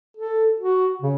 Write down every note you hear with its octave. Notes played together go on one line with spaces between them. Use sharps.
A4
F#4
C#3